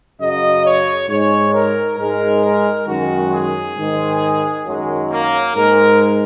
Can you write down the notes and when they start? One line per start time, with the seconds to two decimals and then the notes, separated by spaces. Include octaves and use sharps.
0.20 F#2 C#3 F#3 D#5
0.65 C#5
1.09 G#2 G#3 C#5
1.53 A#4
1.98 G#2 G#3 A#4
2.43 A#4
2.87 F#2 D#3 G#3 F#4
3.33 G#4
3.77 G#2 D#3 G#3
4.66 F#2 D#3 F#3 G#3
5.11 A#3
5.55 G#2 G#3 A#4